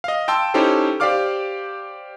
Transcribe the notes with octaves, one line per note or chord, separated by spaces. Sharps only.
D#5 F5
G5 A5 C6 E6
C#4 D#4 E4 G4 A4 C5
G4 C5 D5 F5 D6 F6